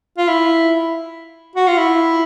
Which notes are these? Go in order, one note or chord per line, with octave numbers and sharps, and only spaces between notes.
F4
E4
F#4
F4
E4